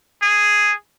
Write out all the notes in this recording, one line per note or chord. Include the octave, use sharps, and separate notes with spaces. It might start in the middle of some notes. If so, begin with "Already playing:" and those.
G#4